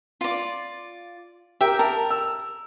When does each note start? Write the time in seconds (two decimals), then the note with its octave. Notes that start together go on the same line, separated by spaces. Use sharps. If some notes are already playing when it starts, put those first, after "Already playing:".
0.21 F4 D5
1.61 G4 A#4 E5 G5
1.79 A#4 A5
2.10 E6